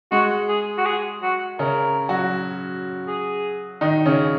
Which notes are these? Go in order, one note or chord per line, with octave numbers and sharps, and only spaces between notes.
G#3 F#4
G#4
F#4
G#4
F#4
C#3 C#4 A#4
F#3 F#4
G#4
D#3 D#4
C#3 C#4